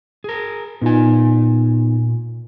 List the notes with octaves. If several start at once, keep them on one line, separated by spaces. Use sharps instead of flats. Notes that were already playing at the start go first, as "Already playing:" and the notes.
G#4 A#4
A#2 B3 D#4 F4 G#5